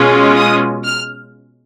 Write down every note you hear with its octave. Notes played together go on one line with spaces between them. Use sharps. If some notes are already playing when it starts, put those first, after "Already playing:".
Already playing: B2 G#3 C#4 F4
D#6
F6